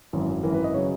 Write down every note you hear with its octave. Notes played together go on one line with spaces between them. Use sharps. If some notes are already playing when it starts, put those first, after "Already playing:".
G#1 F#2 E3
G#1 F#2 E3 A#4
B4
D#5
C#3 F#3 C#5